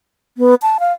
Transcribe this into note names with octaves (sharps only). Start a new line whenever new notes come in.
B3
A5
F5